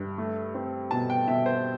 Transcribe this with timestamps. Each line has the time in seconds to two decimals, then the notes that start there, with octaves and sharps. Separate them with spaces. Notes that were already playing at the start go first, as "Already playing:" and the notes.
Already playing: G2
0.18 A3
0.54 C4
0.91 B2 A5
1.10 G5
1.28 B2 E5
1.46 C5